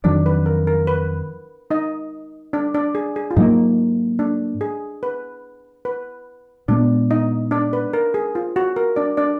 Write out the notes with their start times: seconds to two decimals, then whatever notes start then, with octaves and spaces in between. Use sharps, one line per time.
0.04 F2 D#3 F#3 D4 D5
0.26 B4
0.46 A#4
0.67 A#4
0.87 B4
1.71 D#4 D#5
2.53 D4 D5
2.74 D4 D5
2.95 G#4
3.16 G#4
3.31 F4
3.37 G#2 F#3 A#3 D#4
4.19 D4
4.61 G#4
5.03 B4
5.85 B4
6.68 A#2 G#3 B3 D4 D5
7.11 D#4 D#5
7.51 D4 D5
7.73 B4
7.93 A#4
8.14 G#4
8.35 F4
8.56 F#4
8.76 A#4
8.96 D4 D5
9.17 D4 D5